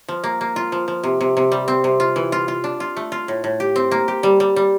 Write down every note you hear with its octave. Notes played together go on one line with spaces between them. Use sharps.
F3
A#3
A#3
F4
F3
F3
C3
C3
C3
G3
C4
C3
F4
E3
F4
F4
D4
F4
A3
F4
A2
A2
G4
C4
A#3
G4
G3
G3
G3